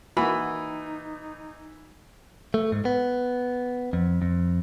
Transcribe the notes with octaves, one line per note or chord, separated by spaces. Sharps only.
E3 A#3 D#4 F#4 B5
A3
G#2
B3
F2
F2